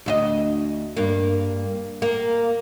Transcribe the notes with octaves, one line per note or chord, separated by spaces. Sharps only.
D2 E4 D#5
G2 A#3
A#3